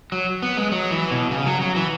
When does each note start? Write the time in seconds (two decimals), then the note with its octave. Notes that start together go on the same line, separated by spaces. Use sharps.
0.12 F#3
0.42 B3
0.57 G#3
0.72 F#3
0.91 E3
1.11 B2
1.31 C#3
1.46 F#3
1.61 F#3
1.76 E3